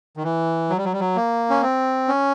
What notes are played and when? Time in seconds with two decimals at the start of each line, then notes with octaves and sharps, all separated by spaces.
0.17 D#3
0.24 E3
0.70 F#3
0.77 G3
0.85 F#3
0.93 G3
1.00 F#3
1.16 A#3
1.50 C#4
1.62 C4
2.08 C#4